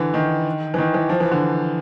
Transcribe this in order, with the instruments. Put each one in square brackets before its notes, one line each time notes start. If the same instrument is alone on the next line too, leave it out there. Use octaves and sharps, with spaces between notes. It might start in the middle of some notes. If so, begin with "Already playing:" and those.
Already playing: [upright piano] D3 E3
D#3
E3
D#3
E3
F3
E3
D3